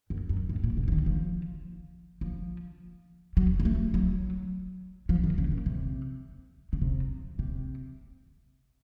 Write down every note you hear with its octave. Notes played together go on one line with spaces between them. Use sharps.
F#2
F#2
A2
A#2
C#3
F3
D#3
F3
F3
F#3
A#3
A3
F#3
F3
D#3
C#3
A#2
C3
C#3
C3
C3